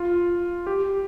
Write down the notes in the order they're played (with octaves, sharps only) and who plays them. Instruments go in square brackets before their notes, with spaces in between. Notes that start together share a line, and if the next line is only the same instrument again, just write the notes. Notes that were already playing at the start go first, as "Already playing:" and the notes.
Already playing: [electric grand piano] F4
G4